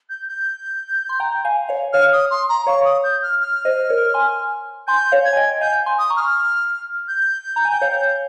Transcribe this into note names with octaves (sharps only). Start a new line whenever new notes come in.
G6
G6
C6
G5 A#5
F5 G#5
C#5 F5
C#5 F5 F6
D#6
C6
A#5
C#5 F5 C#6
D#6
G6
F6
F6
C5 D#5
A#4 C#5
G#5 C6
G#5 C6 G6
C#5 F5
G#6
G#5
D#5 G5
F5 G#5 G6
G#5 C6
D#6
A#5 C#6
F6
G6
A#5
G#5
G5
C#5 F5